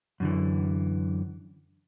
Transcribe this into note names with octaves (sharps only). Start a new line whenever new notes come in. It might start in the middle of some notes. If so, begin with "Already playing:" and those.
F#2 D3 E3